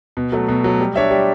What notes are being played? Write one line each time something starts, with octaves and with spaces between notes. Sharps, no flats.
B2
F#3 A3
B2
F#3 A3
G3
D4 G4 C#5 E5
G3